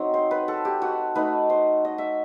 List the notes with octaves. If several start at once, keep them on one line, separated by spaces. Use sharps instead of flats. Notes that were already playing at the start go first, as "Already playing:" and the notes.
Already playing: F#3 C4 D#4
C5
B4
A4
G4
F#4
A3 D#4 B4
C5
D#5
E5